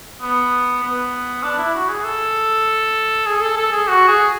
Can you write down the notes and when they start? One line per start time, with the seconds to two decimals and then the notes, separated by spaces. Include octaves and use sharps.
0.22 B3
0.83 B3
1.43 D4
1.58 E4
1.74 F#4
1.89 G#4
2.05 A4
3.26 G#4
3.41 A4
3.57 A4
3.72 G#4
3.88 F#4
4.08 G#4